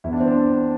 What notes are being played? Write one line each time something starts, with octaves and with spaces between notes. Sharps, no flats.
E2 E4
D4
C4
D4